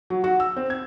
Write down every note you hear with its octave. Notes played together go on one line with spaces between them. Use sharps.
F#3
F#4
E6
C4
G#6